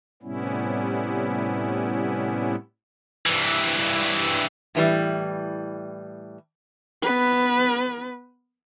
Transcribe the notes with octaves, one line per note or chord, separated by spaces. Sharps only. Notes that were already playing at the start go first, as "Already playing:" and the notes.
A2 C3 G3 B3 C#4 E4
G2 E3
A2 E3 G3
B3 B4